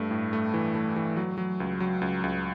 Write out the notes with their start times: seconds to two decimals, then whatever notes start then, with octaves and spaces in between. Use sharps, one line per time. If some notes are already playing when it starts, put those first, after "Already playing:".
Already playing: G2 A3
0.11 A2
0.33 A3
0.54 E3
0.75 A3
0.96 E3
1.17 F#3
1.38 F#3
1.60 C#2
1.80 F#3
2.01 C#2
2.24 C#2